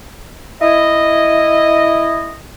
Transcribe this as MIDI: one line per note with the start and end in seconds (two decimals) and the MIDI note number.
0.62 2.35 64
0.62 2.35 75